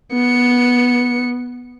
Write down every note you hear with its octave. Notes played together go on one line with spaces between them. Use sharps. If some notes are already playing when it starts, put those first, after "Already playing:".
B3 C#7